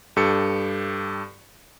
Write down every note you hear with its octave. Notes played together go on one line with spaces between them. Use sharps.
G2 G4 A4 C#7